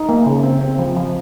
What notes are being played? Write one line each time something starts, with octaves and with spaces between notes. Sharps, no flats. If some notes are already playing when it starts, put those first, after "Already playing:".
Already playing: D#4
A#3
C#3
C4
C4
F3
F3